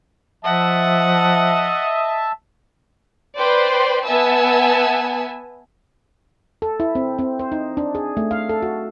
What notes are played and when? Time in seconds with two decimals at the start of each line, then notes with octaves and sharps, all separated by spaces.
0.45 F3 D#5 E5 F#5 A5
3.38 B4 C5 D5 G5 C6
4.06 B3 E5 G#5 A5 E6
6.62 A4
6.80 E4
6.95 C4
7.19 C4
7.39 C5
7.52 D#4
7.77 D4
7.95 G#4
8.17 A3
8.31 F5
8.49 A4
8.62 F#4